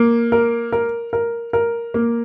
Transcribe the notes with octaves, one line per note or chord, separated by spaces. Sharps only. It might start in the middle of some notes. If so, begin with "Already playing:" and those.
Already playing: A#3
A#4
A#4
A#4
A#4
A#3